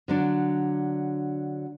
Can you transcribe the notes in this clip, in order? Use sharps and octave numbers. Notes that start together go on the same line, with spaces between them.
D3 F#3 D4